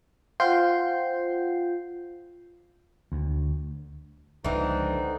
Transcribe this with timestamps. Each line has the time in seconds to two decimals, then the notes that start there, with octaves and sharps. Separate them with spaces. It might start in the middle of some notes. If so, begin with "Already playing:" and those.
0.40 F4 C5 F#5 G5 G6 C7
3.12 D2
4.44 C#2 D3 E3 F3 C4 D#4